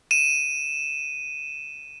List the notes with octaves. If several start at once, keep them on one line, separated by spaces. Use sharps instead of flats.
D#7 E7